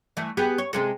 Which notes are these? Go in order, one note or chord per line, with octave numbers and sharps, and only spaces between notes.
E3 A3
B3 G4 G#4
C#5
C3 G#3 A4